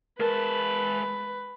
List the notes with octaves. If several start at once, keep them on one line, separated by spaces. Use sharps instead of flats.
G#3 A#4 B4 A5